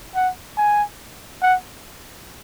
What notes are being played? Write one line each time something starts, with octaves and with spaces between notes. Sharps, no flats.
F#5
G#5
F#5